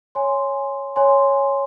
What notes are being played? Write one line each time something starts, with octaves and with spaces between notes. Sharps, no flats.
C#5 G#5 C6
C#5 G#5 C6